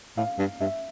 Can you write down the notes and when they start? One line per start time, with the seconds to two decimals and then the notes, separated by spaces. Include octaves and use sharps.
0.17 A2 F5
0.39 G2
0.61 G2 E5